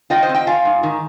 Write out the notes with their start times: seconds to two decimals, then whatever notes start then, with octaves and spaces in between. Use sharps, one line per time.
0.10 F4 D#5 G5
0.22 C5 D#5
0.29 C4
0.35 D#5 G5
0.47 F4 F5 G#5
0.65 G#2
0.83 D#3